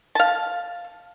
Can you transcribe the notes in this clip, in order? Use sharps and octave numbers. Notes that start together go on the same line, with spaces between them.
F5 A5